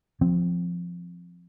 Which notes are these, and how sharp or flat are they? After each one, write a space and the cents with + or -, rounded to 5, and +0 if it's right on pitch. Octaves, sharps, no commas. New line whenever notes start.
F3 +0 C4 +0